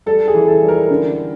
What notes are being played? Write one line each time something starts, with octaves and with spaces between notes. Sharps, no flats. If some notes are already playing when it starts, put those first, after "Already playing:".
G3 A4
G#4
E3
A4
G3
A#4
D3